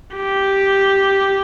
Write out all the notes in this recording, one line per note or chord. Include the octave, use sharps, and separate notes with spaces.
G4